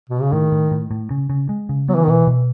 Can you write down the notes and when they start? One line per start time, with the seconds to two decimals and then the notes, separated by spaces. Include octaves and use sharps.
0.09 B2
0.21 C#3
0.33 A2 D#3
0.52 A2
0.71 A2
0.91 A2
1.11 C#3
1.30 C#3
1.49 G#3
1.69 C#3
1.88 F#3 B3
1.95 E3
2.03 D#3
2.08 B2 E3
2.27 B2